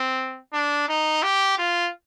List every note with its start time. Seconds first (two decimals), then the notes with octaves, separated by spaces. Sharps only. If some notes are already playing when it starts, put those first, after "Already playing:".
Already playing: C4
0.53 D4
0.89 D#4
1.23 G4
1.58 F4